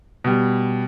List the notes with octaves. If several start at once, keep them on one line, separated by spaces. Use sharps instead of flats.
B2 G3